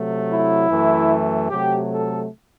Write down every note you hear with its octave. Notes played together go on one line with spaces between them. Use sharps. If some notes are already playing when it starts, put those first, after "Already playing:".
Already playing: C3 F#3 A3
E4
F#2 E3 A3
C3 F#3 A3 G4
A4